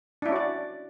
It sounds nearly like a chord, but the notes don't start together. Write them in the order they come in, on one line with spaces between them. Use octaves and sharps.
D4 E4 C#4 F#4 D5